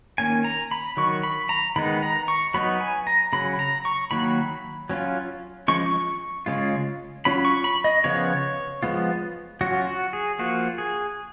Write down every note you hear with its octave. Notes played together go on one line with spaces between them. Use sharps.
D#3 A#3 C#4 G#5
A#5
B5
D#3 F#3 C#6
B5
A#5
D#3 G#3 B3 D#4 B5
A#5
C#6
F#3 B3 D#4 B5
G#5
A#5
C#3 F#3 C#4 B5
A#5
C#6
D#3 F#3 A#3 D#4 B5
F#3 C#4 F4
F3 G#3 C#4 C#6
C#6
C#3 G#3 C#4 F4
F#3 C#4 F4 B5
C#6
B5
D#5
C#3 F3 B3 F4 C#5
F3 G#3 B3 F4
F#3 C#4 F4 F#4
F#4
G#4
F3 A#3 F4 F#4
G#4